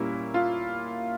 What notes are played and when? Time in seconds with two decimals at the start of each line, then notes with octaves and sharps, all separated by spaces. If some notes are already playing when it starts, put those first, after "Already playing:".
Already playing: A#2 G3 A#3 C#4 E4
0.34 F4